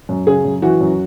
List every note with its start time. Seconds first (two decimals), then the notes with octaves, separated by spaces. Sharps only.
0.09 F#2
0.27 C#3 G#4
0.44 F#2
0.62 E3 F#4
0.81 F#2